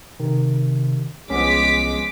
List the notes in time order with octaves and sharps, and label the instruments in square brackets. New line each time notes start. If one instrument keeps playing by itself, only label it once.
[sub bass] C3 [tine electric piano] D#3
[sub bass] C2 [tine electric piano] F3 B3 C#4 [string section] G#3 D6 B6